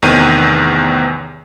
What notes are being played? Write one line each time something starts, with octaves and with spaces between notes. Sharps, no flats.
A1 E2 C3 D#3 C#5 D#7